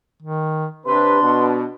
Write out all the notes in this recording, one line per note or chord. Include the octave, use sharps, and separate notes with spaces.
D#3
C3 D4 B4 C6
B2